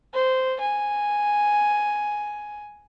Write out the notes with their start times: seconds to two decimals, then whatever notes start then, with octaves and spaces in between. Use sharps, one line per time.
0.14 C5
0.60 G#5